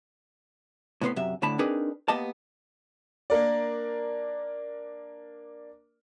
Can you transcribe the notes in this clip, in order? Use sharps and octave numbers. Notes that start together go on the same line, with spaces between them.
A2 C3 B3 B4 C6
F#2 C3 E5
D2 A2 D3 A5 B5
C4 D4 D#4 G#4 A#4 B4
A#3 B3 G4 D#5 A5
A#3 D4 A#4 D5